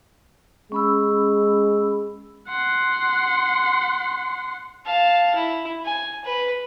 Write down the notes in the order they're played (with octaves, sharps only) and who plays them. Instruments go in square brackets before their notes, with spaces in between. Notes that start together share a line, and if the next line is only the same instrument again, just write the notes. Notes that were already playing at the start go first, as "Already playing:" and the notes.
[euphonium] G#3 [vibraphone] C#4 B5 E6
[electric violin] F#5 C6
[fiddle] F5 A5
E4
G#5
B4